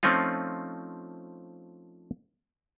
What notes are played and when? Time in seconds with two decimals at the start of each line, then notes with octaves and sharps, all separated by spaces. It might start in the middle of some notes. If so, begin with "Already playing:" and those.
0.03 F3 A3 C4 C#4 D#4 F4